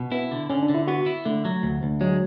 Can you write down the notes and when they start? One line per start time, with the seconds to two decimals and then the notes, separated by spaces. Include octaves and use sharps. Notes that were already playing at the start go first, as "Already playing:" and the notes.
Already playing: B2
0.12 B3 E4
0.31 D3
0.50 D3 C#4
0.63 D4
0.69 D3
0.75 E4
0.87 B3 F#4
1.06 E4
1.25 D3 A3
1.45 F#3
1.63 D2
1.83 D2
2.01 F#3 G#3